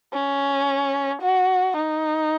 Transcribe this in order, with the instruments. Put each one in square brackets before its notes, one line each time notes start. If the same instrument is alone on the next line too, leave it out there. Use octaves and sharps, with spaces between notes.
[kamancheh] C#4
F#4
D#4